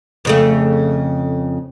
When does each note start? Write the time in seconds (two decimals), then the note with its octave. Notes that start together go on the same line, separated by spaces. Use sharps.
0.25 F2 C#3 A3